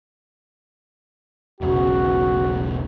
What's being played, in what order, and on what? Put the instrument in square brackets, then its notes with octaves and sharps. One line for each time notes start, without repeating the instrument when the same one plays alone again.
[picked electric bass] E1 B1 C#3 [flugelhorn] F#4